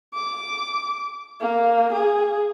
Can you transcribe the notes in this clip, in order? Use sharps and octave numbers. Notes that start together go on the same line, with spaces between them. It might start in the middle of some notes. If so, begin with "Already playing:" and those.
D6
A#3
G#4